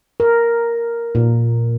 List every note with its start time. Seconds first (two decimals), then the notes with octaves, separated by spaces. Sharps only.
0.20 A#4
1.15 A#2